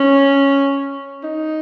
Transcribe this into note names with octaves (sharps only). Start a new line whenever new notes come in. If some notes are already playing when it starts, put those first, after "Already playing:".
Already playing: C#4
D#4